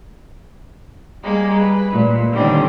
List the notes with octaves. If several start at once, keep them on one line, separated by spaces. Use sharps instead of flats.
G3 G#3 A#3
B4
A#2
D3 D#3 G3 C4 C#4